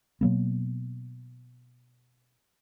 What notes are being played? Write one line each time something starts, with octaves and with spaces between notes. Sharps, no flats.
B2 F#3 A#3 B3